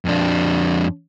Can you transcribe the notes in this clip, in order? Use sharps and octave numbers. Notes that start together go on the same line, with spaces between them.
F2 D4